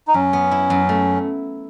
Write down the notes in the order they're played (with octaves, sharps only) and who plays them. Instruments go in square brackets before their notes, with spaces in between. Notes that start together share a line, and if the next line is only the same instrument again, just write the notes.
[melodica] D#4
[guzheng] F#2 [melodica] C#4
[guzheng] B3
E4
F#2
A3